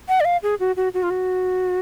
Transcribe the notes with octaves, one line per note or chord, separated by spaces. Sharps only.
F#5
D5
F5
G#4
F#4
F#4
F#4
F4
F#4